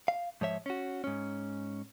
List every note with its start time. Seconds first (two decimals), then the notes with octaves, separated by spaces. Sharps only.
0.08 F5
0.41 G#2 F3 C#5 E5
0.66 C#4 F#4
1.04 G#2 C#4